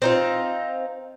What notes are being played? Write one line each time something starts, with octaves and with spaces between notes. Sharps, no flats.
C4 D#4 F4